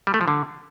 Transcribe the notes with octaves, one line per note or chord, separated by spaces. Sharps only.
G3
A3
F3
D3